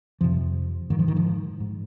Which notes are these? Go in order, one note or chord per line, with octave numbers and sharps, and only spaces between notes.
F2 C3 F3
G#2 D#3
F3
D#3
F3
G#2